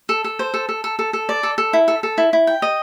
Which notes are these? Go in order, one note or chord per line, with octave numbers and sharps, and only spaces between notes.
A4
A4
C5
A4
A4
A4
A4
A4
D5
A4
A4
E4
A4
A4
E4
E4
G5
D#5